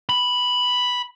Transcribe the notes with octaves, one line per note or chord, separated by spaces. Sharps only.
B5